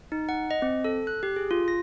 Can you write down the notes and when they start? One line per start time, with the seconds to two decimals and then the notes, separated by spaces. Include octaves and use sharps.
0.12 D#4
0.29 F#5
0.51 D#5
0.62 C4
0.84 A4
1.07 F#6
1.23 G4
1.36 G#4
1.51 F4
1.68 A#6